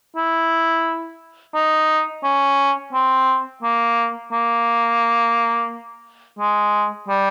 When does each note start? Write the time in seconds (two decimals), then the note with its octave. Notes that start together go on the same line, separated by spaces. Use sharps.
0.16 E4
1.54 D#4
2.24 C#4
2.93 C4
3.62 A#3
4.32 A#3
6.39 G#3
7.08 G3